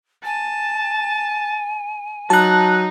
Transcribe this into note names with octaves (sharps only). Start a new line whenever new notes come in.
G#5 A5
F#3 D#4 A5 F#6